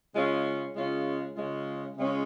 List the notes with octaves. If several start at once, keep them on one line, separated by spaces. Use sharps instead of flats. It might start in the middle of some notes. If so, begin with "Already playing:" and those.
C#3 G#3 C#4 F4
C#3 G#3 C#4 F4
C#3 G#3 C#4 F4
C#3 G#3 C#4 F4